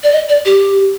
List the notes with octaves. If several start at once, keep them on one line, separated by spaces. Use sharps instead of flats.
D5
D#5
D5
G4